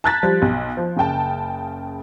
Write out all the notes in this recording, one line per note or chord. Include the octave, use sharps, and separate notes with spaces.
A5 A#5 F#6 G#6 A6 B6
F3 G3
B1
F3
F#1 C#3 G5 A5